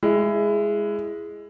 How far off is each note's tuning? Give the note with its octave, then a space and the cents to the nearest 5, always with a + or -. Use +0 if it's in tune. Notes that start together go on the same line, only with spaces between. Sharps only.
G#3 +0 E4 +20